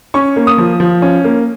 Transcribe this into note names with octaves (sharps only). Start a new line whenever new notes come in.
C#4 C#6
A#3
D#6
F3
F3
C#4
A#3